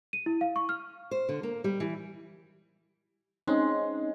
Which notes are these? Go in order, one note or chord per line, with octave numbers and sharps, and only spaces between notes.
D#7
E4
F5
C#6
F6
C5
D3
A#3
G3
E3
G#3 C4 C#4 D#4